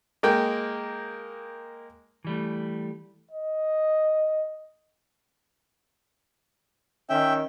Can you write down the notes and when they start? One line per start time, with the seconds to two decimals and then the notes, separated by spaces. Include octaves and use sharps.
0.23 G#3 A#3 G5
2.25 E3 G3 A3
3.31 D#5
7.10 D#3 C#4 E5 G5